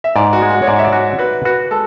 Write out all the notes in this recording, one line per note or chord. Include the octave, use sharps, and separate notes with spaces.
E5
G#2 D5
F#4
G#3
F#4
C#5
G#2 D5
E5
D5
F#4
F#4 B4
F#4 B4
G#3 A4